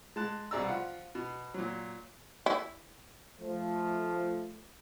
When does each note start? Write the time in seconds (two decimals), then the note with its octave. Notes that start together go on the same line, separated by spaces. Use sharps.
0.16 G#3 A5 F#6
0.51 C2 B2 G#4 D5 A#5 E6
0.67 F3 F4 F#5
1.15 B2
1.54 A#2 F#3
2.46 E4
3.39 F3 A3